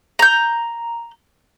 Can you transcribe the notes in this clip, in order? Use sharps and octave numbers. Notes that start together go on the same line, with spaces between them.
A#5 G6